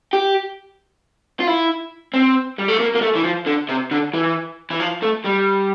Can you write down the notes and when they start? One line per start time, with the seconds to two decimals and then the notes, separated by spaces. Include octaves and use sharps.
0.13 G4
1.40 F4
1.47 E4
2.14 C4
2.59 G3
2.69 A3
2.80 A#3
2.96 A#3
3.02 A3
3.16 E3
3.24 F3
3.47 D3
3.69 C3
3.91 D3
4.14 E3
4.70 E3
4.80 F3
5.02 A3
5.24 G3